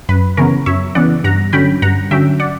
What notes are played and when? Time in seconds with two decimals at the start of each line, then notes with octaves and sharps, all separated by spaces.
0.09 F#2 B4
0.37 C#3 E3 B3 A#4 C#5
0.66 F#2 C#5 E5
0.95 C#3 E3 B3 D5 F#5
1.24 G2 F#5 A#5
1.53 D3 F#3 C#4 G5 B5
1.82 G2 F#5 A#5
2.11 D3 F#3 C#4 E5 G5
2.40 D5 F#5